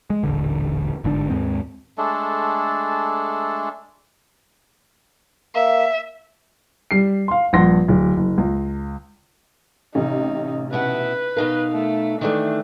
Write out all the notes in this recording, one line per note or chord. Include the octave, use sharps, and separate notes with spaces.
G#3
D#1 A1 D3
G1 G#2 D3 D4
D#2 G#2 G#3 C4
G#3 A3 D4 A4
A#3 E5
G3 C7
F5 C6
A#1 G2 F#5 C6 A#6
D1
F#1
C#2
A1 C3 D#4
B2 E4 B4 F#5
B2 D#4 A#4 F5
A3
D#3 E3 A3 D4